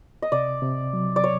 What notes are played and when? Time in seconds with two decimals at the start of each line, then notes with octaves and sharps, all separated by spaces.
0.22 D#5
0.32 C3 D5
0.62 C3
0.93 F#3
1.16 D5
1.24 C#5